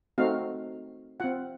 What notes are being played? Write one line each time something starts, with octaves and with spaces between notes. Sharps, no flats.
A3 C4 D#4 F#4 F5
C4 F4 F#5